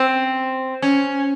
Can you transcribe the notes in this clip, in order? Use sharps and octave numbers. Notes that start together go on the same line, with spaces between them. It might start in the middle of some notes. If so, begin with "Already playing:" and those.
Already playing: C4
C#4